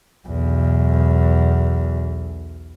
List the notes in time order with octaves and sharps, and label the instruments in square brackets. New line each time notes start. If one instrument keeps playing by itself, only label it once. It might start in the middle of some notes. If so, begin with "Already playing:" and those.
[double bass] B1 E2